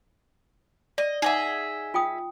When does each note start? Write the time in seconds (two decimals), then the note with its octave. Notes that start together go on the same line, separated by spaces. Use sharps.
0.98 D5 D#5
1.22 D#4 G#4 D#5 E5 F#5
1.94 F4 G5 D#6